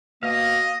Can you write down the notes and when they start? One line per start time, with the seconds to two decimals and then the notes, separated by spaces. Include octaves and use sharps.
0.23 B2 A#3 D#5 F5